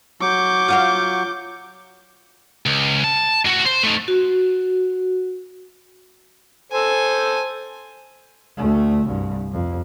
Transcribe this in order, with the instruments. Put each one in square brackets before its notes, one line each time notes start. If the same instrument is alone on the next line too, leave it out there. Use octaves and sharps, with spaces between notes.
[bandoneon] F#3 C#6 [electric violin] D6 G6
[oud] F4 F#4 F5
[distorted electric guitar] C#2
A5
A2 F#4
C5
A3 D#4
[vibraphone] F#4
[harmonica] A4 C5 [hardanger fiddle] G#5
[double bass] D2 A3
C2 G2
F2